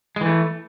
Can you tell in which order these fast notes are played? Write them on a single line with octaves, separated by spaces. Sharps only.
G#3 E3 A3